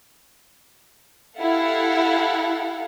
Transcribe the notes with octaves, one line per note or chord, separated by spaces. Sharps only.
E4 G4 A4 F5 F#5